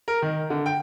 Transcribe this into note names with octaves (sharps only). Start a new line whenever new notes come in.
A#4
D#3
D3
G5